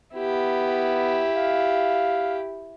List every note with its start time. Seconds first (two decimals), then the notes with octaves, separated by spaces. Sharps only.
0.14 B3 E4 G4
1.37 F5